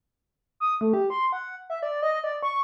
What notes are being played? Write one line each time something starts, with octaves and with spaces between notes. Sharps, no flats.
D#6
A3
G4
C6
F#5
E5
D5
D#5
D5
C#6